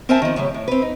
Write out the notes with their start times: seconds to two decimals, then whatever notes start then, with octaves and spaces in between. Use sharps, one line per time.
0.09 C4 A#4 C5 E5 G#5 A5
0.22 D#3 F3
0.36 F#2 A2 C#3 G3
0.54 A2
0.68 C4 B4
0.82 D#4